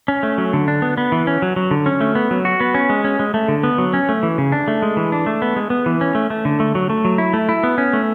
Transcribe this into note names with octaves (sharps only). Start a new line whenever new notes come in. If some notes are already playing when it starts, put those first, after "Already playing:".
C#4
A3
F#3
D3
D4
B3
B3
E3
C#4
F#3
F#3
D3
C#4
A3
B3
F#3
F#4
B3
C#4
G#3
C#4
G#3
A3
D3
B3
F#3
C#4
A3
E3
C#3
D4
A3
G#3
E3
D4
A3
B3
G#3
B3
E3
C#4
A3
A3
D3
A3
F#3
A3
F#3
E4
A3
E4
B3
C#4
A3